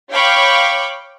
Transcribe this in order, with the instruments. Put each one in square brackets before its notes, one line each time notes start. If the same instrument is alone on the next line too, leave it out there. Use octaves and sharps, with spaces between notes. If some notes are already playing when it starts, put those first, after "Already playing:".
[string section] C#5 F5 G5 B5 C#6 D6